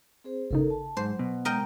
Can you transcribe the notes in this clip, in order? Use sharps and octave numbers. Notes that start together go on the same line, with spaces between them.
C4 G#4 C5
G#1 C#3 D#4 A4 A#4
A5
G#2 F#3 C5
B2
G#3 A#4 D#5 G5